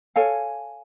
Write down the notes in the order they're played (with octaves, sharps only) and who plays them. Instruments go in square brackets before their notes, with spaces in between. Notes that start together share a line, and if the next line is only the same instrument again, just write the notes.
[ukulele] A4 C#5 F5 G#5